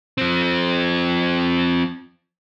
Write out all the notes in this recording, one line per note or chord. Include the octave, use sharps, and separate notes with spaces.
F3 C4